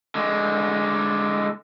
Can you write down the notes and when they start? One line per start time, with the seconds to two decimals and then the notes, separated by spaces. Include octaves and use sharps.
0.15 D3 G#3